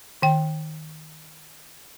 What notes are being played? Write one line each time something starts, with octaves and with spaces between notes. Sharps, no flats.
D#3 G5